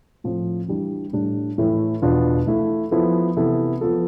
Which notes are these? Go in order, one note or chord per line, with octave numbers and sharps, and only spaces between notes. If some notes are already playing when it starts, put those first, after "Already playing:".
A2 F3 C4
E3 G3 D4
A2 G3 D4
A2 E3 A3 E4
E2 B2 B3 D4 F4
E3 A3 E4
F3 B3 E4 A4
C3 E3 B3 E4 A4
F3 B3 F4 A4